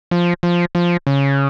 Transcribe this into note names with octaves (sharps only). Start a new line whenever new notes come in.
F3
F3
F3
C#3